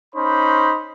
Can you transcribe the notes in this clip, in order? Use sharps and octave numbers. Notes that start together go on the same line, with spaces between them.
C#4 D#4 C5 B5